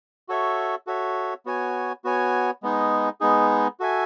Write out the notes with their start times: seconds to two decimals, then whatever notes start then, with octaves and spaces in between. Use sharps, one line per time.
0.29 F#4 A4 C#5 E5
0.87 F#4 A4 C#5 E5
1.46 B3 F#4 C#5 G#5
2.04 B3 F#4 C#5 G#5
2.63 G#3 B3 D#4 G#4
3.21 G#3 B3 D#4 G#4
3.80 F#4 A4 E5 G#5